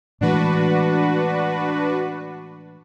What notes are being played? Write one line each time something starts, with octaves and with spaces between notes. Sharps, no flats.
A2 E3 G#3 D4 F#4 B4